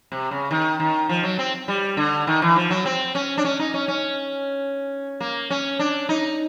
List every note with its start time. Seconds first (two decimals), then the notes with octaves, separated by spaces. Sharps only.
0.12 C3
0.31 C#3
0.51 D#3
0.80 D#3
1.09 F3
1.23 F#3
1.39 C4
1.68 G3
1.97 D3
2.27 D#3
2.42 E3
2.56 F3
2.71 F#3
2.85 C4
3.15 C#4
3.38 D4
3.45 C#4
3.59 D#4
3.74 C#4
3.88 C#4
5.20 A#3
5.50 C#4
5.79 D4
6.09 D#4